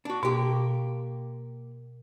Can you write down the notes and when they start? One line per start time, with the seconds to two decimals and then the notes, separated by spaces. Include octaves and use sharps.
0.05 D4 F#4
0.23 B2 A#3 G4